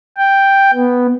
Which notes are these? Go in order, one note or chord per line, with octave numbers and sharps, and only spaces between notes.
G5
B3